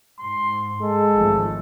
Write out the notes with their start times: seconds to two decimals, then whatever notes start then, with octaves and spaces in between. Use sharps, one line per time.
0.19 G#2 C6
0.81 G#3 A4
1.15 G#1 F3 A3